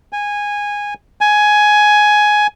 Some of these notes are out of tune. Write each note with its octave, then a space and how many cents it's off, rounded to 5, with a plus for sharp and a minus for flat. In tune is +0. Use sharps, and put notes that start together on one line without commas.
G#5 -15
G#5 +10